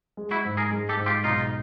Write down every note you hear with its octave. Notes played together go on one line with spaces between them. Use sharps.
G#3
E4 F#4
G#2
G#4 A#4
G#3
G4 A4
G#2
F4 G4
B1 D#4 F4